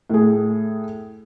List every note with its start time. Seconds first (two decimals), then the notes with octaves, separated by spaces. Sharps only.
0.10 A2 G#4